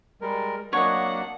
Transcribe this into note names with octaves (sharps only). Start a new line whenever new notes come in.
G3 G#3 A#4
F#3 A#3 D4 C#5 D#5 F#5